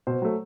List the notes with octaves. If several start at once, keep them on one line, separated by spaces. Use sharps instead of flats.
B2 C5
F#3 A3